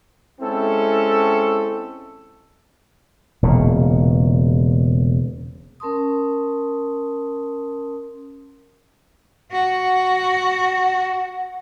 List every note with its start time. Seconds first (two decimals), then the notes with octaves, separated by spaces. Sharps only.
0.40 G#3 C4 C#4 E4 A4
3.42 E1 A#2 C#3
5.80 C#4 A#4 A5 C6 D#6
9.52 F#4 F#5